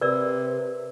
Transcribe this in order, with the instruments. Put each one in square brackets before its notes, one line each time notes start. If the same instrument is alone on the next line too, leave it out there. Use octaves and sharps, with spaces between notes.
[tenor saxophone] C3 [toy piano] A#4 D5 E6 [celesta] B4